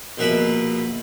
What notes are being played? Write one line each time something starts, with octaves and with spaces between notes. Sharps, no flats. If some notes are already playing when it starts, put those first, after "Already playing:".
A#1 B2 A#4 B4 E5 B5